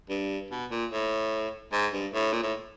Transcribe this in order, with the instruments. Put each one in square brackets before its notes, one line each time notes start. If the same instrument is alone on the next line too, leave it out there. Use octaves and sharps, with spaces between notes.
[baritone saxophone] G2
B2
A#2
A2
G#2
G2
A2
A#2
A2